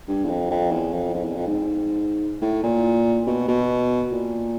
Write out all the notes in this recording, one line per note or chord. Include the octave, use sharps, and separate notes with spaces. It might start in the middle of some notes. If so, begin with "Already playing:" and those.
G2
E2
F2
F2
E2
F2
F2
E2
F2
G#2
A2
A#2
B2
B2
A#2